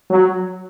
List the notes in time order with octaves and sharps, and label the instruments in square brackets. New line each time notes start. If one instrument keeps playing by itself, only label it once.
[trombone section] F#3